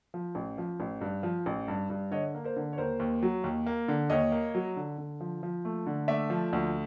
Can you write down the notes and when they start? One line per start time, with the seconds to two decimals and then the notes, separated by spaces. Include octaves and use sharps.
0.14 F3
0.35 A1
0.58 F3
0.80 A1
1.01 G2
1.23 F3
1.46 A1
1.68 G2
1.90 G2
2.11 D3 C#5 D#5
2.34 A#3
2.44 A#4 C5
2.57 D3
2.73 C#5
2.78 D#2 A#4 C5
3.00 D#2
3.23 F#3
3.44 D#2
3.66 A#3
3.88 D3
4.10 D#2 C#5 D#5
4.32 A#3
4.55 F#3
4.77 D3
4.98 D3
5.21 F3
5.43 F3
5.65 A3
5.87 D3
6.08 A3 D5 E5
6.30 F3
6.53 D2